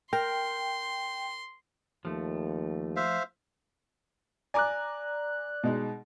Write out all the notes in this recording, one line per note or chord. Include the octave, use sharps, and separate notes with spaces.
A#4 G5 C6
D#2 F3 A3
C5 E5 F5
D5 G#5 A#5 D6 F#6
B2 G#3 D#4